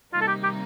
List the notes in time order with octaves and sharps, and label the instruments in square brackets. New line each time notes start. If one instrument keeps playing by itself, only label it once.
[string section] C3 D#3 G3 A#3 D#4 [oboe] F4
[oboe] A4
G4
G4